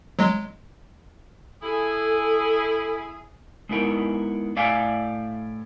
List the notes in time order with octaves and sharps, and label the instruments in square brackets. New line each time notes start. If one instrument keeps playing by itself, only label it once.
[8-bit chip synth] F#3 G#3
[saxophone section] E4 G#4 [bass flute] A4
[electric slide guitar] G#3 B3 D#4 E4 A#4
A2 D5 E5 F5 G5 G#5